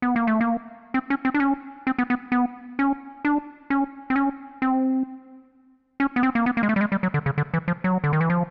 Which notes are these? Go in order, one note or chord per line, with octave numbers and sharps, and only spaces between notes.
B3
A#3
A3
A#3
C4
C#4
C4
D4
C#4
C4
B3
B3
B3
C#4
D4
C#4
C4
C#4
C4
C#4
B3
C4
A#3
B3
A#3
G#3
A3
G3
G#3
G3
F#3
D3
C#3
D3
E3
F3
F#3
D3
D#3
E3
F3